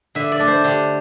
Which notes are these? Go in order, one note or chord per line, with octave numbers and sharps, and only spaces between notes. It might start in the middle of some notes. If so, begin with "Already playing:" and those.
D3 E5
D5
A3 D4
C5
D3 G4